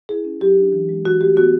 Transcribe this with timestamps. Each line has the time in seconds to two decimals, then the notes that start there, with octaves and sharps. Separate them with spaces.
0.09 E4 G#4
0.25 C#4
0.41 F#3 G4
0.58 D4
0.73 E3
0.89 G#3
1.04 E3 F#4
1.21 A3 G4
1.36 B3 F#4